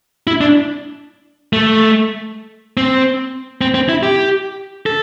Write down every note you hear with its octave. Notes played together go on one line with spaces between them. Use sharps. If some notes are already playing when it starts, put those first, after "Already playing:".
E4
D4
A3
C4
C4
C4
E4
G4
A4